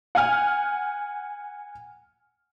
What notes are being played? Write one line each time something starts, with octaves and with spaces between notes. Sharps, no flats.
F#5 G#5 F6